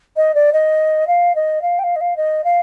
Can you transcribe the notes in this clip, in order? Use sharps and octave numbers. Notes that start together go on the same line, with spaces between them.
D#5
D5
D#5
F5
D#5
F5
G5
F5
D#5
F5
D#5
F5